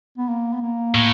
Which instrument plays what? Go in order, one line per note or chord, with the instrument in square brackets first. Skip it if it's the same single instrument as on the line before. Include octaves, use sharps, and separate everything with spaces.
[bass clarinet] B3
A#3
B3
A#3
[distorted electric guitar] A2